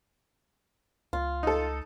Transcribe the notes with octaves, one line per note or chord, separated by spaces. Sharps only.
C#2 F4
D#4 A4